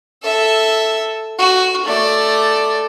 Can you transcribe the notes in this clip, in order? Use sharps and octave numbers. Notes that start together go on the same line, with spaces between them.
A4 E5
F#4
A3 D5